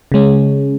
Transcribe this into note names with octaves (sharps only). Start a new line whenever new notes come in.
C#3 G#3 C#4